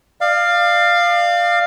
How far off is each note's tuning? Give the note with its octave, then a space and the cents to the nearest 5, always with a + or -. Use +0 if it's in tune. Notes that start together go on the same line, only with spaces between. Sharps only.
D5 +35 F5 +0